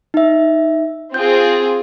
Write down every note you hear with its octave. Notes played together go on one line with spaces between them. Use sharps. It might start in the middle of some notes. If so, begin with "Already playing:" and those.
D#4 E5
C4 F4 G#4 G6